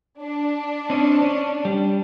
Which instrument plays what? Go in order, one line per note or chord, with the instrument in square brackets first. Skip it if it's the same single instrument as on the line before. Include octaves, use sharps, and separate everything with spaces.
[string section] D4
[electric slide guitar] C4 C#4 D#4
C#4
G3